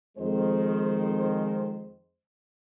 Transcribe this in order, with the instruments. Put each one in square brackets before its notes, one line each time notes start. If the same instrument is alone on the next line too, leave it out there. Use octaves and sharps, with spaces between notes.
[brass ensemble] F2 D#3 G#3 C5